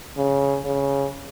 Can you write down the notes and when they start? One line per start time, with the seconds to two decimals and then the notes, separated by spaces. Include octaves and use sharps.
0.17 C#3
0.65 C#3